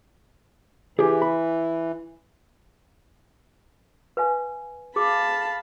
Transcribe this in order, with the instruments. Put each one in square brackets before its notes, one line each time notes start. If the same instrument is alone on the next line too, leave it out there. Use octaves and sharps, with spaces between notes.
[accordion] E3 [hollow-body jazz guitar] G4 G#4
[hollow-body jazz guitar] B5
[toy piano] B4 F5 G#5
[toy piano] G#4 D6 [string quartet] F5 A5 B5